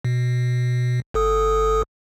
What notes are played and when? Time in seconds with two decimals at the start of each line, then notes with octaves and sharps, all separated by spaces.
0.05 B2
1.14 G1 A4 D#6